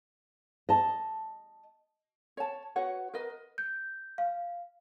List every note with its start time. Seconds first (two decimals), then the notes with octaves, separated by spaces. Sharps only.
0.69 D#5 A5
2.37 C#5 A5
2.76 F#4 B4 C#5 F#5
3.14 A#4 B4 D#5
3.58 G6
4.18 F5